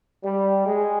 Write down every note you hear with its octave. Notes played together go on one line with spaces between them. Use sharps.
G3
G#3